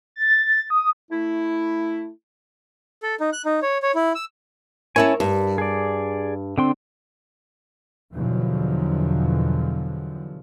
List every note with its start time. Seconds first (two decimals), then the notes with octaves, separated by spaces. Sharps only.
0.16 A6
0.70 D#6
1.11 A3 E4
3.03 A4
3.20 D#4
3.33 F#6
3.45 D#4
3.63 C#5
3.83 C#5
3.95 E4
4.15 E6
4.96 C#4 E4 A#4 C#5 G#5 A5
5.20 G2 G3
5.58 G#4 D5
6.58 D3 C4 D4 G5 C6
8.13 E2 B2 D3 F3 F#3